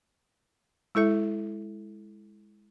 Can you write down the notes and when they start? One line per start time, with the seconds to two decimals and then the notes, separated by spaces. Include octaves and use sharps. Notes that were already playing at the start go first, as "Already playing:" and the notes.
0.95 G#3 E4 A4 E5